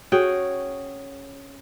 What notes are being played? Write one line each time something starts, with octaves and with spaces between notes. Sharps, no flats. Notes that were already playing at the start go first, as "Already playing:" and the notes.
C#4 F#4 G#4 G5